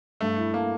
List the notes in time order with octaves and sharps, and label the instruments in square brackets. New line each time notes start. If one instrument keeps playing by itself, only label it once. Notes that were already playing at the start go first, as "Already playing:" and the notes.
[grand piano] G2 [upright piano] A3
[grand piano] E4
[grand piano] A3 [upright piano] A#3